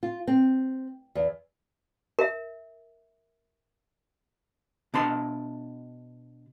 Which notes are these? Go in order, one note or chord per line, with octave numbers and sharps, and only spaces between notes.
F4
C4
E2
A#4 E5
B2 D4 A5 C6